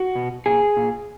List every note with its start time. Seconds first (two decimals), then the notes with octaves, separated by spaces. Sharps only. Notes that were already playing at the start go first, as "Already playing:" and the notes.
Already playing: F#4
0.15 B2
0.46 A#2 G#4
0.77 A#2